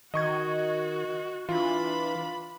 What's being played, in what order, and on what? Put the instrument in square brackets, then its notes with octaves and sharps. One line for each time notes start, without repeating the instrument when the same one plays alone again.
[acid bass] D#3 [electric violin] F#4 [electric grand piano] D#5 C#6 G#6
[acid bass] E3 [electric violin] D4 B5 [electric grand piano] F4